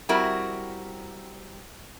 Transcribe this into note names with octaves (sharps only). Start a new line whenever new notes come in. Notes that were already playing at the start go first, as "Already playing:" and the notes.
G3 C4 E4 F#4 A#4